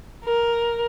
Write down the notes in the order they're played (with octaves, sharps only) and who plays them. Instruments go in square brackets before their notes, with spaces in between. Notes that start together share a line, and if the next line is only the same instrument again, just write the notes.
[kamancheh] A#4